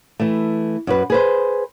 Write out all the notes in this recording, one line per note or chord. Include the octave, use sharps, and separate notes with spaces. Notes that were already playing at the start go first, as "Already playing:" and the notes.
E3 A3
F#2 F#4 B4
G#4 B4 C5